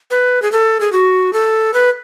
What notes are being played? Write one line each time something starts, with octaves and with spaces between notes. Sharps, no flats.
B4
G#4
A4
G#4
F#4
A4
B4